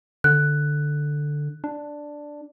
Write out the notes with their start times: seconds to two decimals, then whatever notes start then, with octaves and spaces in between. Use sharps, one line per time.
0.24 D3 F#6
1.64 D4